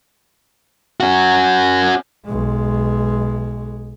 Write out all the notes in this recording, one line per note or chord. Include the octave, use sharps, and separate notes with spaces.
C#4 F#4
B1 G#3